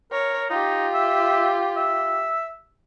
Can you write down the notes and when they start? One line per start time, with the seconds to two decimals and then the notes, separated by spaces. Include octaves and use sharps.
0.12 A#4 C#5
0.50 D#4 F4 G4
0.94 E5
1.77 E5